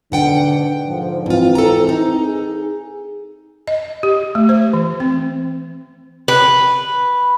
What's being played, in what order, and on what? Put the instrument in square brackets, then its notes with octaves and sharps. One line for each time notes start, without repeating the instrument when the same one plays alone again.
[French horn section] G#2 D3 [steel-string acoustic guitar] B2 F#5 G5
[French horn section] G#2 D3 F3
[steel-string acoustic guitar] G#2 F4 [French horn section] E3 C4
[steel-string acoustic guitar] A4 A#5
D#4
[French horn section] G#4
[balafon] D#5
G4
A3
C5
E3
C4
[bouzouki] B4